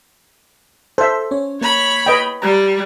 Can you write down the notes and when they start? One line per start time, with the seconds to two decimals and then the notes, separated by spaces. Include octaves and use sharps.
0.98 A4 C5 E5
1.31 C#4 C#5
1.61 A#3 C#5 B5
2.06 B4 D#5 G5
2.42 G3 A#5